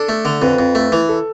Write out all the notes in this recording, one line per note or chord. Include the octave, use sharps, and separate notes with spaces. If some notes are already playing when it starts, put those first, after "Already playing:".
Already playing: D4 A4
A3
D3
F2 B4
F2
A3
E3
A4